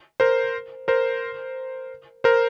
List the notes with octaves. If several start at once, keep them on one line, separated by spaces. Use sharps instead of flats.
A#4 C5
A#4 C5
A#4 C5